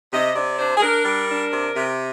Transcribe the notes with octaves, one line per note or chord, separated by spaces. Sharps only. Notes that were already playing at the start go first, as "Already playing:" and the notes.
C3 D#5
C3 D5
D4 C5
G#4
D4 A#4
G3 A#4
D4
C3
C3